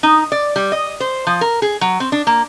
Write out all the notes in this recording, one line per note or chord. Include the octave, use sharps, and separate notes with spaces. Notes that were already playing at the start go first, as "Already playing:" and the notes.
D#4
D5
G3
D#5
C5
F3
A#4
G#4
F#3
C4
D4
A#3